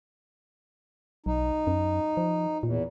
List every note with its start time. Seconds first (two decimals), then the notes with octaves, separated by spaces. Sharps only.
1.26 B1 D#4
1.67 F#2
2.17 F3
2.63 E2 A#2